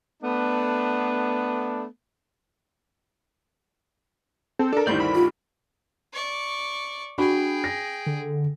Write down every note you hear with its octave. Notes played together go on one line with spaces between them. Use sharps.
A3 B3 D4
C4 A4
D4 A4 A#4
D2 G2 D#3 E4 C5 D5 G6
B5
F4
D5 C#6
D4 F#4 G#4 G5 B5
A#6
D3